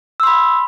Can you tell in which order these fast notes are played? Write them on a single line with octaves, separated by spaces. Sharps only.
E6 C6 B5